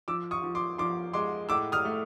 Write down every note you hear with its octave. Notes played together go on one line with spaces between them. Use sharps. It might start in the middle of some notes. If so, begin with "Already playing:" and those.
F3 D6 E6
C#6 D#6
F3
C6 D6
F3 C6 D6
G#3 C6 D6
A2 D6 E6
D#6 F6
A3